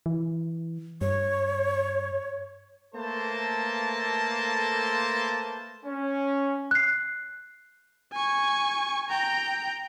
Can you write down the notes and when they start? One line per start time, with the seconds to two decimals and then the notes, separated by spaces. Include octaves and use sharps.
0.06 E3
1.01 G2 C#5
2.95 A3 A#3 A4 B4 C5 A5
5.85 C#4
6.71 F#6 C7
8.13 G#5 C#6
9.09 G5 A#5